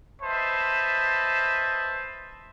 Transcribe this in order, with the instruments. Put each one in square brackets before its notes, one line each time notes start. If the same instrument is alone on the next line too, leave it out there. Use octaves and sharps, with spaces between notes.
[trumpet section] B4 C5 D#5 E5 A5